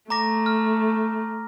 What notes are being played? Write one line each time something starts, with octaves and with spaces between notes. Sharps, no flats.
A3 A#5 D6 A#6
F6